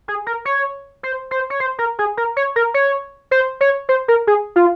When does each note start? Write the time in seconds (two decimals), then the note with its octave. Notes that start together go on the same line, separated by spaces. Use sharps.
0.08 G#4
0.26 A#4
0.45 C#5
1.03 C5
1.31 C5
1.50 C#5
1.60 C5
1.79 A#4
1.99 G#4
2.17 A#4
2.37 C#5
2.56 A#4
2.74 C#5
3.31 C5
3.61 C#5
3.89 C5
4.08 A#4
4.27 G#4
4.56 F4